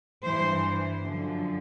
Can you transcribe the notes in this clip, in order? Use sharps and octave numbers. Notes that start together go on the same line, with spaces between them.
G2 E3 C5
F#2 D3 F3